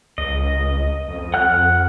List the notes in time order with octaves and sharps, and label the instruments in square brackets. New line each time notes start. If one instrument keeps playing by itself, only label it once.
[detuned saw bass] C#2 [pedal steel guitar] D#5
[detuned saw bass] F2
[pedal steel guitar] F#5 F6 F#6